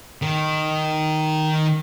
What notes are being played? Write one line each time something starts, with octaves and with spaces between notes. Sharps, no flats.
D#3